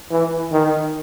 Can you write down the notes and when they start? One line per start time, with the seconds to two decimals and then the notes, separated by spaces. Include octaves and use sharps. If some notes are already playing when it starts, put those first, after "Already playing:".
0.10 E3
0.52 D#3